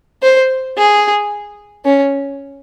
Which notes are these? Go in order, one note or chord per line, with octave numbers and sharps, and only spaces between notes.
C5
G#4
C#4